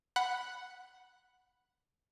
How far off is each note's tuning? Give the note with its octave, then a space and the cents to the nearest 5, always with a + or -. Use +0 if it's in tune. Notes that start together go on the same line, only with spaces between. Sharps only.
F#5 +0 B5 +0